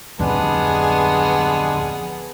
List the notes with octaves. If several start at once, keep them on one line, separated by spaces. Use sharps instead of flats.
D1 F2 G3 G#3 B3 D4 G#4